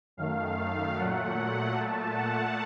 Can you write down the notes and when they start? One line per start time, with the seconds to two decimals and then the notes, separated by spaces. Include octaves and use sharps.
0.17 F#2 D#3 A3 F5
0.96 A#2 F#3 A3 F#5
1.75 A#2 A3 A5
2.14 F#5